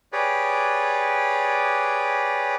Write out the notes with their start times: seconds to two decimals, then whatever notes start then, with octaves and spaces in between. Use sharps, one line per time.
0.13 G4 G#4 B4 C#5 D5